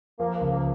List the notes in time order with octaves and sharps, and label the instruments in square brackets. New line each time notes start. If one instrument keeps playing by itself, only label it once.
[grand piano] F3 [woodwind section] A#3
[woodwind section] A#3
[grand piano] C#2
[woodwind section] A#3